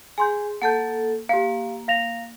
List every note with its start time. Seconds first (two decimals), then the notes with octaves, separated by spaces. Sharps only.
0.18 G#4 G#5 C6 G6
0.62 A#3 A4 F#5 A5 G6
1.29 A#3 G4 F5
1.88 F5 A#6 F7